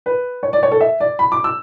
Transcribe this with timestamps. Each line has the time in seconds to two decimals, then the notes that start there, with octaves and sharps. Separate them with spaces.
0.06 B4
0.43 C#5
0.53 D5
0.63 C#5
0.72 A4
0.81 E5
1.00 D5
1.19 B5
1.32 D6
1.44 E6